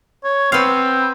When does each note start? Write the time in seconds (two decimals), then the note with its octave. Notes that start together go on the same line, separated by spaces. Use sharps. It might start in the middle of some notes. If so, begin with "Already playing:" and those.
0.24 C#5
0.52 B3 C4 F5